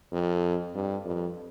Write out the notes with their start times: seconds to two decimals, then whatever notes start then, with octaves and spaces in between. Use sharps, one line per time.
0.12 F2
0.75 G2
1.06 F2